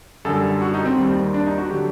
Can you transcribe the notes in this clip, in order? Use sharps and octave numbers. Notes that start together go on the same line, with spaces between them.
F#2 D3 G3 A4
F#4
D#4
C4
D#2 D#3 G3
D4
D#4
F#4
D3 F#3 G4